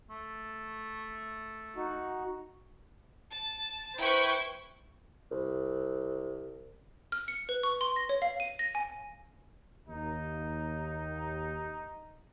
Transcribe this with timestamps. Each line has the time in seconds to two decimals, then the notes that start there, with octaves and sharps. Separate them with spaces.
0.10 A3
1.76 D#4 F#4
3.31 A5
3.98 E4 B4 C5 G5 C#6
5.31 C2
7.12 F6
7.28 C#7
7.49 B4
7.63 C#6
7.81 C6
7.96 A#6
8.09 C#5
8.22 F5
8.40 D#7
8.59 A#6
8.75 G#5
9.88 D#2 D#4